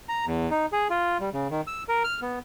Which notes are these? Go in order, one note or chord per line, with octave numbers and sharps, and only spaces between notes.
A#5
E2
D#4
G#4
F4
G3
C#3
D#3
E6
A#4
F6
B3